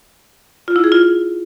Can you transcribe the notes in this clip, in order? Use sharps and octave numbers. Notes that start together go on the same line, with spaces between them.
F4
E4
G#4
F4